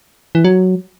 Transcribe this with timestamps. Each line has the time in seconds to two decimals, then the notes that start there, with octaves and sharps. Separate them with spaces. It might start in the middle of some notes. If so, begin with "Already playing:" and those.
0.35 E3
0.44 F#3